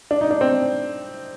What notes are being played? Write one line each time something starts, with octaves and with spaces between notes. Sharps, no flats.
D4
D#4
D4
C4